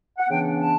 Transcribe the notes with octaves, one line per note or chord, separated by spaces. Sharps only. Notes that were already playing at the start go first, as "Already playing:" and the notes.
F#5
C#3 E3 B3 D4 G5
A5